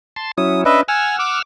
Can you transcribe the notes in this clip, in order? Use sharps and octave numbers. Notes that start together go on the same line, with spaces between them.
A5 C6
F#3 C#4 E4 D#6
C#4 D4 B4 D#5 E5
F#5 G#5 E6 F6
D6